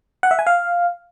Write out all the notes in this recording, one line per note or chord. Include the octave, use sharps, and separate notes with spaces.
F#5
E5
G#5
F5